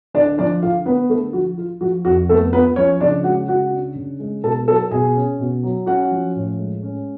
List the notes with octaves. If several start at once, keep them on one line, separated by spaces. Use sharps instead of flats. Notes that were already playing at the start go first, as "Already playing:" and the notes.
D3 D4 D5
F3 D4 D5
D3 F4 F5
B3 B4
D3 A3 A4
F3 F#4
F4
F3 F#4
F2 F#4
A3 B3 A4
B3 F4 B4
F3 C#4 C#5
C#3 D4 D5
G#3 F#4 F#5
C#3 F#4 F#5
D4
C#3
G#3
B2 A4 A5
F#3 A4 A5
B2 G#4 G#5
C#4
B2
F#3
C#4 F#4 F#5
F3
A2
G#3
C#4